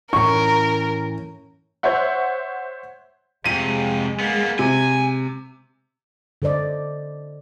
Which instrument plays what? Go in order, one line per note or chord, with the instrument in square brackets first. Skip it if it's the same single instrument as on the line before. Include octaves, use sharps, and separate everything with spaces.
[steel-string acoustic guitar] A2 E3 C#4 [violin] A#4 [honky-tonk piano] C#6
[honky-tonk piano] C5 C#5 E5 F#5
[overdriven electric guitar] F2 C3 [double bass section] G#3 [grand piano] D#7
[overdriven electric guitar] A#3 B3
[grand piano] C3 [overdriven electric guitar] G#5
[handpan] D3 A4 C5 D5 D#5